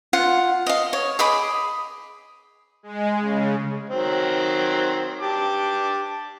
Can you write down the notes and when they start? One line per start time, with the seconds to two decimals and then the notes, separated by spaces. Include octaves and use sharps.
0.13 F4 F#5
0.66 D#5 F5
0.93 C#5
1.19 G#4 D#5 B5 D6
2.83 G#3
3.19 C#3
3.90 D#3 F#3 C4
5.21 G4 A5 D6